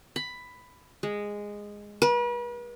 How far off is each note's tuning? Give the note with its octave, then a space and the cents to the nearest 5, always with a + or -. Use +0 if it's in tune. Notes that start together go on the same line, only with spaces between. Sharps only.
B5 +10
G#3 -10
B4 -40